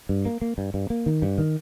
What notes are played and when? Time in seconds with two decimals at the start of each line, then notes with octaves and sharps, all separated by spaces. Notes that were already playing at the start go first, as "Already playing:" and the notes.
0.09 G2
0.26 A#3
0.42 A#3
0.58 G2
0.74 G2
0.90 A#3
1.06 D#3
1.22 G2
1.38 D#3